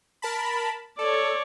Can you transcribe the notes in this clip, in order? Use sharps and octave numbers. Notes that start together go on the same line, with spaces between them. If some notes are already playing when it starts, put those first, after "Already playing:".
A#4 A5 B5
A4 C#5 D5